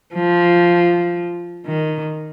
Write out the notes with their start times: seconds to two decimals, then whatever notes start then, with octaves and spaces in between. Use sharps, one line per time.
0.14 F3
1.66 D#3